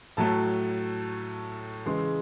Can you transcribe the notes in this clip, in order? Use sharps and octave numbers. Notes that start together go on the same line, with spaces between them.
A2 F#3 A3 A5
C#3 E3 G#3 C6